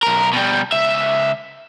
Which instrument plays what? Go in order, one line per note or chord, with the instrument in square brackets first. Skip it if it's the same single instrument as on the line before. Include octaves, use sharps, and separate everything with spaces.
[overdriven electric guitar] B1 A#4
B2 G3
C#2 E5